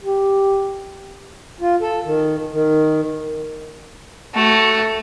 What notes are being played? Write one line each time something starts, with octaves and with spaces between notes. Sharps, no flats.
G4
F4
A4
D#3
D#3
A3 F#4